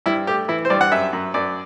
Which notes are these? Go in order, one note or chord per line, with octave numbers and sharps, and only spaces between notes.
G2 E4
A3 G4
E3 E4
C5
G2 D5
F#5
F#2 E5
F#2
F#2 D5